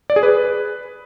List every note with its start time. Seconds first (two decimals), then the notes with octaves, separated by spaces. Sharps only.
0.10 D5
0.16 G#4
0.23 B4